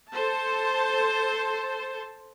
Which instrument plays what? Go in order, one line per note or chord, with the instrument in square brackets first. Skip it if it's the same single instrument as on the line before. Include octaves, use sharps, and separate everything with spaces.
[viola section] A4 C5 A5